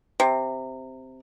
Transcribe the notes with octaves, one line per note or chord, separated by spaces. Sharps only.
C3